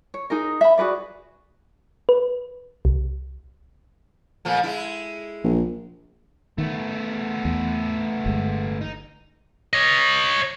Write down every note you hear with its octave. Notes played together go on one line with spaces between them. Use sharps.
C#5
D#4 G#4 A#4
E5 B5
F#4 G#4 B4 D5
B4
C2
A#2 F3 A3
G#3 E4
A#1
D#3 A3 B3
E2
G1 G#3
D#4
C#5 D#5